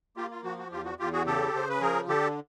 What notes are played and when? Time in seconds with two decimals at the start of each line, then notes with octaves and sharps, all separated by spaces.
0.17 A#3 F4 G4
0.31 F4
0.44 F3 F#4
0.59 F#4
0.71 E2 F4 G4
0.85 F#4
0.99 E2 F4 G4
1.13 F#4 G#4
1.26 C#3 G4 A4
1.54 C#3 C5
1.69 B4
1.81 F3 G#4 A#4
2.08 D3 G4 A4